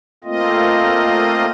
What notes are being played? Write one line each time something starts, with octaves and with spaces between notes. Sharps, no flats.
A3 A#3 C4 F4 D#5